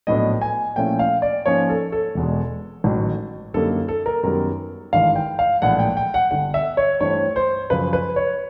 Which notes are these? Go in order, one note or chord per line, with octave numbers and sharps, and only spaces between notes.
A#1 A2 F#3 B3 D4 D#5
G#5
A#2 F3 A3 C#4 E4 G5
F5
D5
G#2 F3 A#3 C#4 F4 C#5
A4
A4
E1 E2 B2 G#3
A1 G#2 D#3 F#3
F#2 D3 G3 A#3 D#4 A4
A4
A#4
F#2 D#3 G3 B3 A#4
G#1 G2 E3 G#3 F5
G5
F5
A#1 A2 E3 G#3 F#5
G5
G5
F#5
G1 G2 D3 F#5
E5
C#5
G2 E3 A3 C4 C#5
C5
F#2 C#3 F3 B4
B4
C#5